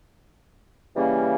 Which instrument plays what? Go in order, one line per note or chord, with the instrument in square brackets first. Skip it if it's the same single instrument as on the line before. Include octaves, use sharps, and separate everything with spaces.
[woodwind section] C#3 E3 G3 A#3 C#4